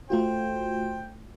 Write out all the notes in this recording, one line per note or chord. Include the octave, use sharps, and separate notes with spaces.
A3 F4 F#4 C5 G5